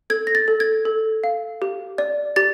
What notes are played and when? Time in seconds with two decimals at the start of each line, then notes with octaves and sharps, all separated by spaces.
0.10 A4 G#6
0.27 A#6
0.35 A6
0.48 A4
0.60 G#6
0.85 A4
1.24 F5
1.62 G4
1.98 D5
2.36 G4 A6